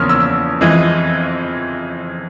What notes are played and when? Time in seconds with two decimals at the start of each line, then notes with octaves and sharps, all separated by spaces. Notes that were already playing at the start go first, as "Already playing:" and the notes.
Already playing: E2 C#3 F3 A#3 C#4 C6 F6
0.09 E6
0.61 F2 E3 G#3